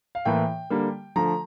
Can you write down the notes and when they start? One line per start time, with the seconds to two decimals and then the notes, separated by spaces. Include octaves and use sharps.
0.15 F5
0.25 A2 E3 A#3 G5
0.70 D3 G3 A#3
1.16 D3 F3 A3 A#5